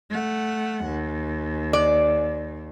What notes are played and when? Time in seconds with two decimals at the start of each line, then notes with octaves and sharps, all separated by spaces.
0.10 A3 F#5
0.85 D#2
1.73 D5